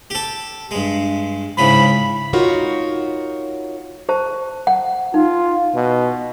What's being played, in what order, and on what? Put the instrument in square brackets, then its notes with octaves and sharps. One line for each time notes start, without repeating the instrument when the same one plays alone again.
[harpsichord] G4 A4
G2 G#3
[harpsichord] G#2 C#3 E3 [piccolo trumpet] B5
[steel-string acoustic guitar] D#4 F4 F#4 A#4 C#5
[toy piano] G4 C5 A5
F#5
[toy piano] D#4 [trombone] F4
[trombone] B2